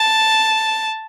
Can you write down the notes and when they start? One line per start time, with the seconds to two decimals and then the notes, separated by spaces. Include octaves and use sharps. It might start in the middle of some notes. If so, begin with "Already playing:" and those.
Already playing: A5